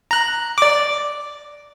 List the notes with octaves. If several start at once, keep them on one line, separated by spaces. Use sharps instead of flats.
A#5 F#6
D5 D6